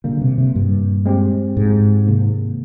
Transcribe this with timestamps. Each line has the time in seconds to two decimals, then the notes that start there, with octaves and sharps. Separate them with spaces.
0.04 A#2 D3 G3 A#3
0.21 C3
0.38 C3
0.55 G2
1.06 G#3 C4 G4
1.57 G#2
2.07 C3 D#3 A#3